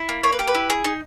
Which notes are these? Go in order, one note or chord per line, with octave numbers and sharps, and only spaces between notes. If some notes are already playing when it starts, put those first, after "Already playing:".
Already playing: E4
A#3
A#3 C#5
B4
G4 A#4
B4
E4
G#4
D#4